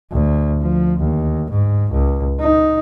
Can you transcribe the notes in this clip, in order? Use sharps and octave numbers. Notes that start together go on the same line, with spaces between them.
D2
F3
D#2
G#2
C#2
D#4